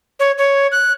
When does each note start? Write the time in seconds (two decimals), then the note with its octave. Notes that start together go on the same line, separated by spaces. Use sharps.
0.20 C#5
0.38 C#5
0.72 F#6